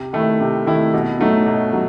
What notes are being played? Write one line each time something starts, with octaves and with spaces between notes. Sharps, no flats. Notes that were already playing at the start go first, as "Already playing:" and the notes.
Already playing: C3
D#3 A3 E4
C3
D#3 A3 E4
B2
F#3 A3 D#4
B2
F#3